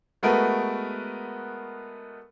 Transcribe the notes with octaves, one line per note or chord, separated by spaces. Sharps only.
G#3 A3 B3 F#4 A#4 B4